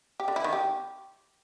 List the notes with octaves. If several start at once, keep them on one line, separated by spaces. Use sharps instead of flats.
G4
D3
E4
D#3
G4